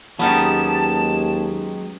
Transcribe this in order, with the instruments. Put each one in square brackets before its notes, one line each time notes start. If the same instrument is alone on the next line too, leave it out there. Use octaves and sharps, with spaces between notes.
[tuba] D#2 [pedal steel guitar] F#3 G#3 G4 [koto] B3 C#4 D#4 [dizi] A5